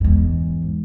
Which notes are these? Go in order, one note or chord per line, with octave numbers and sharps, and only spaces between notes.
E2 G#2